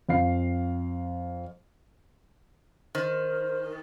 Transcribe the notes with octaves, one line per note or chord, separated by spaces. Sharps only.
F2 F5 C7
D#3 C5